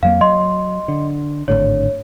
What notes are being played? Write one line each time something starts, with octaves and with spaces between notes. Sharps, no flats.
F2 F#3 A#3 F5
F#3 D#5 C6
D3
G#1 A2 D3 C#5